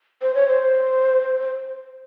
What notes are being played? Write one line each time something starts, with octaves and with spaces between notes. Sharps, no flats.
C5
C#5
C5